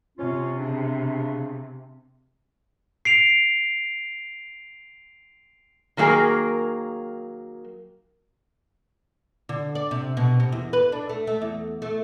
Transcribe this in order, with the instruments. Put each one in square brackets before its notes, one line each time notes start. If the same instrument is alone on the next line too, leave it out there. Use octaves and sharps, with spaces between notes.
[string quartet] C3 [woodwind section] C#4 F4
[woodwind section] C#3 D4
[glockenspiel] C7 D7 F7
[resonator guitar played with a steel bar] D#3 F#3 A#3 F#4 G#4 A#4
[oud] D3
D5
C3
B2
C3
E2
B4
D4
A3
A3
E2
A3